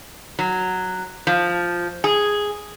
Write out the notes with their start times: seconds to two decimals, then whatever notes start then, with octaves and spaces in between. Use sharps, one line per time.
0.39 F#3
1.27 F3
2.04 G#4